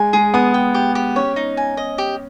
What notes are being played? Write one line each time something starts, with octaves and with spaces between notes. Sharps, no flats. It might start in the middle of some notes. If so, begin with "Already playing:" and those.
Already playing: G#3 G#5
G#3 G#4
B3 D#6
G5
G4
G4
C#4 C#5
D#4
G#5
D#5
G4